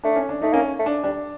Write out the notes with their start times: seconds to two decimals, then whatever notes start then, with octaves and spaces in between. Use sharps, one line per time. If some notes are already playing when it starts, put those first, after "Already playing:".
0.04 A3 D4
0.16 C#4
0.29 D4
0.42 A3 D#4
0.53 A#3 C#4
0.79 A3
0.86 D4
1.03 G3 D4